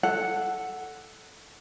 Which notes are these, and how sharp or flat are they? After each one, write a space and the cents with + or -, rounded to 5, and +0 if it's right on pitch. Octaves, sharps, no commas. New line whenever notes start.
A4 +0 F#5 +0